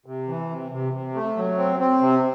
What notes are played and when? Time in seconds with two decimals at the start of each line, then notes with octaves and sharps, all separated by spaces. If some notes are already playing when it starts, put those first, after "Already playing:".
0.06 C3
0.28 E3
0.50 C3
0.72 C3
0.93 C3
1.15 A3
1.37 F#3
1.58 C4
1.80 C4
2.01 C3